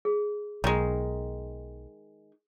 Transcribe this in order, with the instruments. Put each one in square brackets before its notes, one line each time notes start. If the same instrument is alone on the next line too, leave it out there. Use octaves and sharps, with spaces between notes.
[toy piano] G#4
[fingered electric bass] B1 [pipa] D#3 G#3